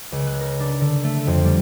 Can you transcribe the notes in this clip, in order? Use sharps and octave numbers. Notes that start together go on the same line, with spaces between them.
C#2
F#6
A#4
D4
D3
A3
F2
G3